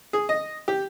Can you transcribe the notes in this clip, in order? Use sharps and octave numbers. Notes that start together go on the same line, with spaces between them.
G#4
D#5
G4